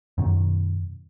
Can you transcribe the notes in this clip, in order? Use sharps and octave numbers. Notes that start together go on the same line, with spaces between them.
F#2 B2 D#3